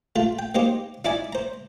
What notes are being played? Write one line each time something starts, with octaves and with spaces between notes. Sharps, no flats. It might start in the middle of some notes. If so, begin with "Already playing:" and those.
A3 F4
G5
A#3 D#4 G4 C5
D#4 E4 D5 G#5 D6
C5 A#5